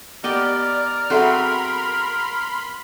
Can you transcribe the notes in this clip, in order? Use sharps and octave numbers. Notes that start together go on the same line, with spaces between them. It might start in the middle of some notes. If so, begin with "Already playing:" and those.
B3 G4 A#4 D5 D#5
F#3 C4 G#4 A4 E5 F#5 B5 C6